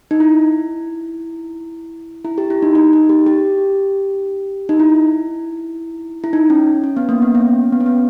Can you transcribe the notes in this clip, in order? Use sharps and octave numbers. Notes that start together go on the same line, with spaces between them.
D#4
E4
E4
G4
E4
D#4
D#4
D#4
G4
G4
D#4
E4
E4
D#4
C#4
C#4
B3
A#3
B3
C#4
B3
C#4
B3